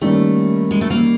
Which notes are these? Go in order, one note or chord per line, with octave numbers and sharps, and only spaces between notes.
D#3 G3 A3 A#3 C#4
G#3
A3
A#3